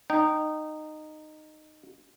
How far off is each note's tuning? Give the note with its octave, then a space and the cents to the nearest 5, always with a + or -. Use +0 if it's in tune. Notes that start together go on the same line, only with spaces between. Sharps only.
D#4 -15 G5 -20